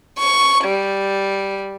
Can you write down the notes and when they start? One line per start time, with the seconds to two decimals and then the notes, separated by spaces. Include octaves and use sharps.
0.18 C#6
0.65 G3